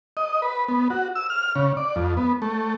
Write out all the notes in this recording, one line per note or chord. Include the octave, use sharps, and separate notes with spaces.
D#5
B4
B3
F#4
E6
F6
C#3
D5
F2
B3
A3